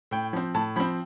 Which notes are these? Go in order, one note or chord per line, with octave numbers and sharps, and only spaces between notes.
A2 G5
F3 C4
A2 A5
F3 C4 B5